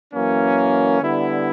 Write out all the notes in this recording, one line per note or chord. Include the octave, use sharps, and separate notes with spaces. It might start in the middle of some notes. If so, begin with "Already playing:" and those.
F#2 E3 A#3 C#4
D3 G3 B3 E4